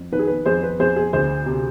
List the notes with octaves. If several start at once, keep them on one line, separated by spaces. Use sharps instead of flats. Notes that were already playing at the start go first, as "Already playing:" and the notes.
Already playing: F2
D#3 B4
G#4
B4
F2 G#4 C5
B4
F2 G#4 C5
G#4
D2 G#4 C5
C3